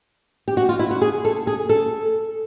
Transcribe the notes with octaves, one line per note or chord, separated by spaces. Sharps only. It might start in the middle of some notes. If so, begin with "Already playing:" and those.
G4
F#4
F4
E4
F#4
G#4
A4
G#4
A4